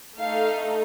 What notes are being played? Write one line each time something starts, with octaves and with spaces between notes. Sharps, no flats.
A3 D#4 A4 F5